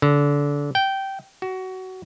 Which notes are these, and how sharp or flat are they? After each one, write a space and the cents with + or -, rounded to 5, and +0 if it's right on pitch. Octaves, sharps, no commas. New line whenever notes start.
D3 -25
G5 -15
F#4 +20